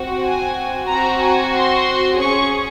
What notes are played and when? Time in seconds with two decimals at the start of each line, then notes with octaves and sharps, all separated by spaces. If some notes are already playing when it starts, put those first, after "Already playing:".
Already playing: C4 F#4
0.24 G#5
0.88 C4 F#4 A#5
1.21 G#5
1.54 C6
2.19 C#4 G#4 C#6